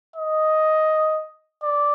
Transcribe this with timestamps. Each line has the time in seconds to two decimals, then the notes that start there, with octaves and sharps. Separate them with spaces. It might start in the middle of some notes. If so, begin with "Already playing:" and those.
0.16 D#5
1.63 D5